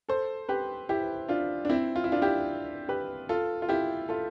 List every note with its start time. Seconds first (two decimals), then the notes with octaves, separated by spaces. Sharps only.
0.09 A4 C5
0.49 G4 B4
0.89 E4 G4
1.28 D4 F4
1.65 D4
1.69 C4 E4
1.96 F4
2.04 E4
2.12 D4 F4
2.22 E4 G4
2.89 G4 B4
3.29 F4 A4
3.62 F4
3.69 E4 G4
4.09 F4 A4